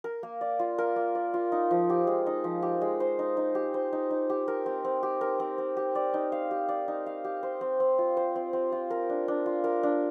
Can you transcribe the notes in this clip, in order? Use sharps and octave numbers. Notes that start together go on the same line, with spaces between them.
A#4
A#3
D5
F4
A#4
A#3
D5
F4
D#4
F3
G4
G#3
D#4
F3
G4
G#3
C5
D#4
D#4
G4
C5
D#4
D#4
G4
A#4
C4
C4
G4
A#4
C4
C4
G4
D5
D#4
F5
G4
D5
D#4
F5
G4
C5
C4
C4
F4
C5
C4
C4
F4
A#4
D4
D4
F4
A#4
D4